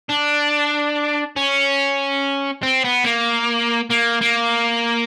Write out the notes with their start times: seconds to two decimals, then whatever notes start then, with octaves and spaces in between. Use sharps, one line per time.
0.10 D4
1.37 C#4
2.63 C4
2.84 B3
3.05 A#3
3.90 A#3
4.21 A#3